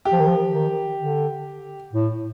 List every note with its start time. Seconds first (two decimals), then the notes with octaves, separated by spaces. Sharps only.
0.05 G4
0.12 F3
0.20 D#3
0.27 F3
0.52 D#3
0.99 D3
1.93 A2